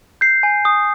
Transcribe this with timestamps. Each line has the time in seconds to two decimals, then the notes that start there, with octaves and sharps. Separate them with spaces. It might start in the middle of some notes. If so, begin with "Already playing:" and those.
0.21 G6 C7
0.43 G#5
0.65 D#6